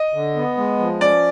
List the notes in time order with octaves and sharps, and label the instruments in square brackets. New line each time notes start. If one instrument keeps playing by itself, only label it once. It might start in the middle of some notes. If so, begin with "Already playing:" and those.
Already playing: [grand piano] D#5
[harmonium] D3
B3
G#3
F3
[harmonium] C#4 [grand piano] D5